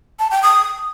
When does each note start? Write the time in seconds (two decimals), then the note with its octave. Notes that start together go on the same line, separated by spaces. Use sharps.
0.19 A5
0.31 G5
0.43 D#6